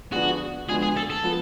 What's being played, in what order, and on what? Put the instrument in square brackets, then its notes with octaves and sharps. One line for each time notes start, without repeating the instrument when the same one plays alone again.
[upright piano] D3 F3 B3 D4 G#4 [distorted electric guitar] F#4
[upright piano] D3 F3 G#3 B3 F#4 [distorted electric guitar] G#4
[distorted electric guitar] G#4
A4
A4
[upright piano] F3 B3